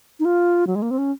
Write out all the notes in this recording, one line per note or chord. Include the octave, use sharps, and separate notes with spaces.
D#4
F4
F#3
G#3
A#3
C4
C#4